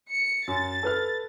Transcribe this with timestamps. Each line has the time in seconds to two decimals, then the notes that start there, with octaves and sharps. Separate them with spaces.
0.10 C#7
0.48 F#2 A6
0.83 A4 B4 F6